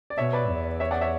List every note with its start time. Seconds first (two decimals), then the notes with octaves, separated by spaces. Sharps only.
0.10 D5
0.18 B2 C#5 E5
0.33 B4 D5
0.49 E2
0.80 C#5 E5
0.91 D5 F#5
1.01 C#5 E5